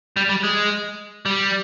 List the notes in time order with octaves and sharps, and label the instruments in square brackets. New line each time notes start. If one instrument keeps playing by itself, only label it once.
[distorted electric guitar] G3
G3
G#3
G3